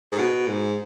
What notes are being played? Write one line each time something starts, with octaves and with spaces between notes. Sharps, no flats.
G#2
B2
G#2